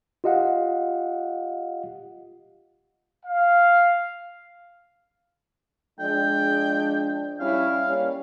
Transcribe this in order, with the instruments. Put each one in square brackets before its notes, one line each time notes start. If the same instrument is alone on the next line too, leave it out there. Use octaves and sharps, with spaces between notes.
[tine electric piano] F4 G4 D#5 F5 F#5
[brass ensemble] F5
[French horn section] F3 G#3 D4 [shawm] G5
[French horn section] G3 C#4 E4 [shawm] F5
[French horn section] G3 A#3 C#4